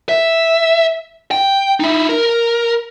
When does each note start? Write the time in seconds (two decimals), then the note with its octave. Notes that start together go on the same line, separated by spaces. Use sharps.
0.09 E5
1.31 G5
1.80 D#4 E4
2.09 A#4